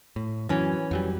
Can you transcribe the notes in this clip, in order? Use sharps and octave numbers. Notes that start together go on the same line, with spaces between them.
A2
F#2 E3 F#3 C#4
F2 F#3 G3